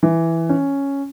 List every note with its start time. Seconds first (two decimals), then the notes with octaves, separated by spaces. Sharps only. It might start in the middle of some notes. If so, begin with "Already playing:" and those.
0.03 E3
0.49 C#4